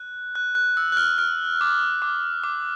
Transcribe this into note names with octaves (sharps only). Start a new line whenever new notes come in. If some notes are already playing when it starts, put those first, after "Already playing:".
Already playing: F#6
F#6
F#6
E6
F#6
F6
F6
D6
D6
D6